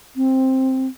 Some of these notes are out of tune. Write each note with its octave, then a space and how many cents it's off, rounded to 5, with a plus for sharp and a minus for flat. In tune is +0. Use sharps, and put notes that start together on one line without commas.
C4 +5